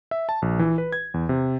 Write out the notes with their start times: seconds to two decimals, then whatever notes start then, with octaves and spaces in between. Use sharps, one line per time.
0.11 E5
0.29 A5
0.42 A#1
0.59 E3
0.78 B4
0.93 G#6
1.14 E2
1.29 C3